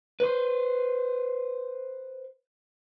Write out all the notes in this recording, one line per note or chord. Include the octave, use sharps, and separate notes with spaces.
B4 C5